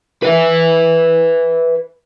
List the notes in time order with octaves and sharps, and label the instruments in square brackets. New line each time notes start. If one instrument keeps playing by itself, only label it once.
[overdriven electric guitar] B4 E5